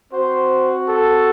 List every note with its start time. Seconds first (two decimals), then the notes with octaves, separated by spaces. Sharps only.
0.13 C4 F#4 C5
0.89 A4